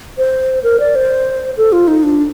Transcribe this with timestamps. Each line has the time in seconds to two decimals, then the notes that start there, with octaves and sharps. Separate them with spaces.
0.18 C5
0.63 A#4
0.80 D5
0.95 C5
1.57 A4
1.72 F4
1.88 D#4
2.03 D4